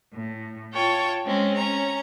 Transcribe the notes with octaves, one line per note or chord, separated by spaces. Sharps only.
A2
F4 C#5 G5 A5
G#3 C4 C#4
C#4 A#5